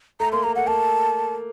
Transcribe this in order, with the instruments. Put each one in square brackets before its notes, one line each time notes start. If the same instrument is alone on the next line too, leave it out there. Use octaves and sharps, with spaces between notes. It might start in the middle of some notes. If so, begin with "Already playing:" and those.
[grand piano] A3 [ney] A#5
[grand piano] A#3 [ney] C6
[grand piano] A3 [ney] A#5
[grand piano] A3 [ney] F#5
[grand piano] A#3 [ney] A5